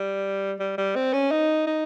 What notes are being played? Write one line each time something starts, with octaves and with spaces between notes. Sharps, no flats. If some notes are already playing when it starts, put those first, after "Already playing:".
Already playing: G3
G3
G3
C4
C#4
D#4
D#4